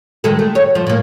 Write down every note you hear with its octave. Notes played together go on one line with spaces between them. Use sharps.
D#3 G#3 A4
A3
C#5
F3
A2 A#3